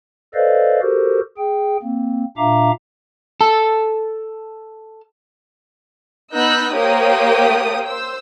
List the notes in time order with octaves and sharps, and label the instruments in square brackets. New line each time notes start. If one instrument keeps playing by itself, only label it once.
[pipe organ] A4 B4 C5 D5 D#5 F5
F#4 G4 A4 A#4 C5
G#4 G5
A#3 C4
A#2 D4 E5 F5 A#5 D6
[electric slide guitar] A4 A5
[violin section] B3 D#4 E6 F#6 G6
A#3 G4 C5 C#5 G5 D#6
C5 E6